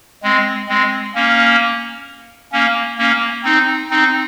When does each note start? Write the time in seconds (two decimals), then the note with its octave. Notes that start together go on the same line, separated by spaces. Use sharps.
0.23 G#3 C4
0.69 G#3 C4
1.15 A#3 C#4
2.52 A#3 C#4
2.98 A#3 C#4
3.44 C4 D#4
3.90 C4 D#4